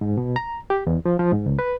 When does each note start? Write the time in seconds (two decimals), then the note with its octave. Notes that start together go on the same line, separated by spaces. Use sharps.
0.01 G#2
0.18 B2
0.36 A#5
0.70 G4
0.87 E2
1.06 F3
1.19 F3
1.33 G#2
1.46 C#2
1.59 B4